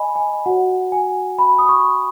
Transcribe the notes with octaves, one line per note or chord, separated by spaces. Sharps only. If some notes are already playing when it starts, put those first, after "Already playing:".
Already playing: D#5 G#5 B5
G#5
F#4 C#5 F#5
G#5
B5
D#6
C#6